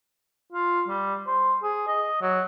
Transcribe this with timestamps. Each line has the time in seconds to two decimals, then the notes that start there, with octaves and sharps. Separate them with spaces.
0.53 F4
0.88 G3
1.27 C5
1.63 G#4
1.88 D#5
2.21 F#3